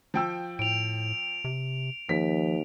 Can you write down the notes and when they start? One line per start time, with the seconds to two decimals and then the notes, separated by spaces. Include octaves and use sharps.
0.14 F3 G5 E6
0.59 A2 D7 F7
1.44 C3
2.09 D#2 F3 B6